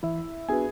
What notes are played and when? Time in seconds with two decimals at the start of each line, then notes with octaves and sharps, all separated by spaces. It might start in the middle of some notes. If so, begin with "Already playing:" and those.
0.03 E3 E4 E5
0.49 B3 D4 F#4 G#4 B4 G#5